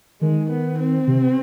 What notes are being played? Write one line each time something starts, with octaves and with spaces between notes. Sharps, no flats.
D#3 G#3
B3
C4
C3